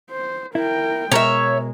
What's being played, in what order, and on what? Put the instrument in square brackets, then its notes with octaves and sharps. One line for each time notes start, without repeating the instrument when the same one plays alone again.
[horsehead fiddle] C5
[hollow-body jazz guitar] E4 [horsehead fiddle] A#4 G5
[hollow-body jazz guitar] B2 A#4 [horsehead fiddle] G#3 [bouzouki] C#5 E5